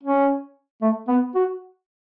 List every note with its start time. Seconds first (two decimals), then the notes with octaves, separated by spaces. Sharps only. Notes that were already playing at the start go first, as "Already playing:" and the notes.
0.03 C#4
0.81 A3
1.08 B3
1.35 F#4